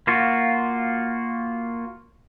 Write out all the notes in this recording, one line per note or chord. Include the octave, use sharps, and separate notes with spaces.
A#3 F4 F#4